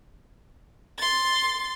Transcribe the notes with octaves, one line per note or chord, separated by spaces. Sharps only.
C6 A6